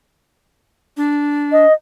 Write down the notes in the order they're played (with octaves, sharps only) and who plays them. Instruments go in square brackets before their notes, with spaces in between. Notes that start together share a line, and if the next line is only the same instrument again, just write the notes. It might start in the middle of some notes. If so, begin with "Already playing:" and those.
[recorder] D4
[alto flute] D#5